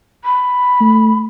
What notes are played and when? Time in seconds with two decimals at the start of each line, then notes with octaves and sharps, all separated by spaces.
0.25 B5
0.80 A3